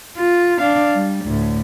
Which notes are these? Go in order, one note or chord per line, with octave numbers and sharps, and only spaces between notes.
F4
D4 F5
G3
D2 A2